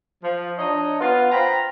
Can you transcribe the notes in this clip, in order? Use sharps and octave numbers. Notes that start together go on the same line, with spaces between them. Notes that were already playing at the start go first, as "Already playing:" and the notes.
F3
D4 D#4 C#5 D#5
B3 F4
C5 F5 G5 A#5 B5